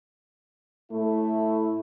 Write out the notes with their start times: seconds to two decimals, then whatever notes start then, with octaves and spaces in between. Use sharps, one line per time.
0.92 A2 A3 E4